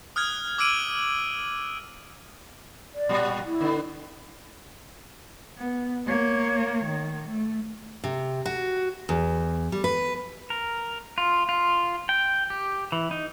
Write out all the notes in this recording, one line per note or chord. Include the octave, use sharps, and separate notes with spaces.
D#6 F6 F#6 G#6
D6 E6 F6 D7 D#7 F#7
D5
A#2 G3 F#4
E4
D3 B3
B3
A#3 C#5
D#3
A3
C3
F#4
E2
G3
B4
A#4
F4
F4
G5
G4
E3
D#4